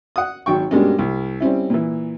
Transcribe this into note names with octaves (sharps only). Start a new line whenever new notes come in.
F#5 D#6
G#1 F#3 G5 C#6
G2 B2 G3 G#3 A#3 C#4
C2
G3 C4 C#4 E4
A#2 E3